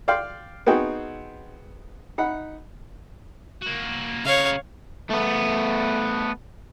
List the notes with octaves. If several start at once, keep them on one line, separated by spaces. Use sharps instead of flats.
D5 F5 G5 C6
B3 C4 D#4 F#4 G#4 G5
D#4 F#5 B5
A#3 F#4
C#3 A#4 C#5 F5
A3 B3